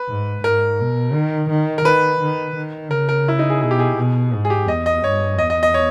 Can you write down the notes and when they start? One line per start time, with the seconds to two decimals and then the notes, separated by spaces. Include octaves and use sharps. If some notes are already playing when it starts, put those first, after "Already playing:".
Already playing: B4
0.09 G#2
0.44 G#2 A#4
0.80 B2
1.14 D#3
1.50 D#3
1.78 A#4
1.85 D#3 B4
2.21 D#3
2.56 D#3
2.91 C#3 A#4
3.09 A#4
3.28 E4
3.39 D#4
3.50 G#4
3.61 B2 G#4
3.71 G4
3.79 G#4
3.97 B2
4.33 G#2
4.45 G#4
4.50 G4
4.67 E2 D#5
4.86 D#5
5.03 G2 C#5
5.39 E2 D#5
5.50 D#5
5.63 D#5
5.74 C#5